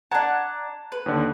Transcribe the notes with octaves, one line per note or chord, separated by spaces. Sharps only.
D4 F#5 A5 A#5 G#6
B4
D#2 D3